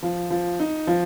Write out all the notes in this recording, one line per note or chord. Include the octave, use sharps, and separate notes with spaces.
F3
F3
D#4
F3